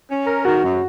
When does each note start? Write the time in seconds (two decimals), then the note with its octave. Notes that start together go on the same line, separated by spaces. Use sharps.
0.10 C#4
0.27 A#4
0.45 D#3 F#4
0.63 F#2